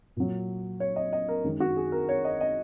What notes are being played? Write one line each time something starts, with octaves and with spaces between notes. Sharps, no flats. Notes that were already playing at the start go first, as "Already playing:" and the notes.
A#2 F#3
C#5
D#5
D#5
A#4
F#2 D#3 G#3
F#4
G#4
A#4
C#5
D#5
D#5